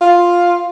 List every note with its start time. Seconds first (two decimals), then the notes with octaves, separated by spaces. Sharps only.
0.01 F4